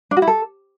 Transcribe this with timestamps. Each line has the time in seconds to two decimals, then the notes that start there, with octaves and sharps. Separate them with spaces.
0.11 D4
0.17 F#4
0.22 E4
0.27 A4